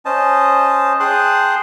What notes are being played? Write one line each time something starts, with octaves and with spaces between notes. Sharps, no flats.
C#4 C5 D#5 A5
G#4 G5 A5 C6 D#6 F#6